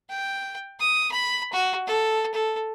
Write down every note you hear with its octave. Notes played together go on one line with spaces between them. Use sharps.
G5
D#6
B5
F#4
A4
A4